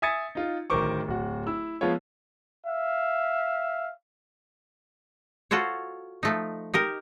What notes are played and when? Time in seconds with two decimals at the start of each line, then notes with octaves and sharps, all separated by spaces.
0.02 E5 G#5 D#6 G#6 A6 C#7
0.35 D#4 F4
0.70 D1 D#3 A#4 C5 C#6 D6
1.08 D1 F#4
1.47 E4 E6
1.81 F3 G#3 B3 F4 C#5
2.65 E5 F5
5.51 F4 F#4 A4 C5 C#5
6.23 F3 A3 D#4
6.74 D#4 G4 A#4